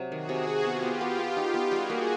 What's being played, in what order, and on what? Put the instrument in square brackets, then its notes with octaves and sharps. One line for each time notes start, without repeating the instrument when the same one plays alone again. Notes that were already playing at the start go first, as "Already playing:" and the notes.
Already playing: [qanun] C3 F#3
[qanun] D#3 [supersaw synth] F#4 G#4
[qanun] C3
C3
[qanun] B3 [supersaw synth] F4 G4
[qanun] B3
B3
B3
D#4
B3
[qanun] G3 [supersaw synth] F#4 G#4
[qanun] A#3